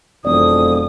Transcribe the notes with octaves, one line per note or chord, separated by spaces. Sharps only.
E1 F2 D5 D#6